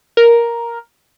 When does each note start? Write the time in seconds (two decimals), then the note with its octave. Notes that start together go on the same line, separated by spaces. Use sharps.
0.17 A#4